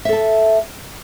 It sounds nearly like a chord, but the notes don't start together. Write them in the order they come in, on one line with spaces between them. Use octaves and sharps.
E5 A4 A5